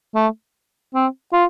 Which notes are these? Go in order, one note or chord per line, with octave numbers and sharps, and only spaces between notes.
A3
C4
F4